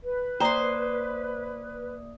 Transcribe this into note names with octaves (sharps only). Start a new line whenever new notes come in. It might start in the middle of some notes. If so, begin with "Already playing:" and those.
B4
A#3 C5 D5 G5 A#5 C6 D#6